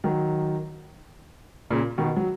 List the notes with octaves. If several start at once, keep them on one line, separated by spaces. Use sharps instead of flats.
D#3 F#3
A#2 C#3
B2 D#3
F#3